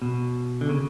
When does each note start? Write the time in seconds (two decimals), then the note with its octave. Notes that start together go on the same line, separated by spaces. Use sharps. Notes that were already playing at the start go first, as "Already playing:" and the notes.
0.02 B2
0.61 D3
0.69 C#3